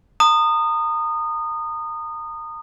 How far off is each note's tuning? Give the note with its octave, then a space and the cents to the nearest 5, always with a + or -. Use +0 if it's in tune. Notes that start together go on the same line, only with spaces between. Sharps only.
A#5 -35 D#6 -20